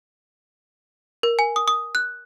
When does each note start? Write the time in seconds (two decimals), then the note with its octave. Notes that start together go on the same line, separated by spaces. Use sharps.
1.23 A#4
1.39 G#5
1.56 D#6
1.68 D#6
1.95 F#6